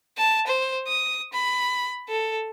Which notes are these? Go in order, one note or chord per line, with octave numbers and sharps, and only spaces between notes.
A5
C5
D#6
B5
A4